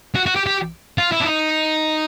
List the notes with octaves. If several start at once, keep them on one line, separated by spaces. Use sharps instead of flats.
F#4
F#4
G4
G4
F4
E4
D4
D#4